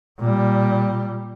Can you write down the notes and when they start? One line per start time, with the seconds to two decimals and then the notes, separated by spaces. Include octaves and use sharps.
0.20 A#2 G3